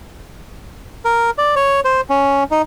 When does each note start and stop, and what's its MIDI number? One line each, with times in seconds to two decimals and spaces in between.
1.05 1.30 70
1.38 1.55 74
1.56 1.80 73
1.85 2.01 72
2.10 2.44 61
2.51 2.62 63